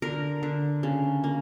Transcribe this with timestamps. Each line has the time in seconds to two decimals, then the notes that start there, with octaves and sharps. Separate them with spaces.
0.02 D3 A#4
0.43 D3
0.83 C#3
1.24 A#3